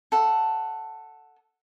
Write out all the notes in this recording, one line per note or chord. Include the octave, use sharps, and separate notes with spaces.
A4 F#5